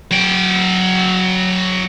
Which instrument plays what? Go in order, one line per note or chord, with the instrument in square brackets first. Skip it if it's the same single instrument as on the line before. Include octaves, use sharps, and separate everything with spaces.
[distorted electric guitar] F#3 G5